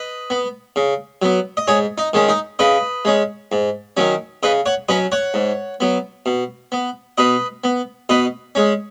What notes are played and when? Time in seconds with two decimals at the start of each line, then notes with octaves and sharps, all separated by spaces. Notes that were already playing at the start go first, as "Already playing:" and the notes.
Already playing: B4 D#5
0.30 B3
0.76 C#3
1.22 F#3 B3
1.57 D#5
1.67 G#2 G#4 C#5
1.98 D#4
2.13 D#3 G#3 C#4
2.28 D#4
2.59 C#3 B4 D#5
3.05 G#3 C#4
3.52 G#2
3.97 D#3 F#3 C#4
4.43 C#3 B4 D#5
4.66 C#5 F#5
4.89 F#3 C#4 B4 D#5
5.12 C#5 F#5
5.34 G#2
5.80 F#3 B3
6.26 B2
6.72 B3
7.18 B2 B4 D#5
7.64 B3
8.09 B2 B4 D#5
8.55 G#3 C#4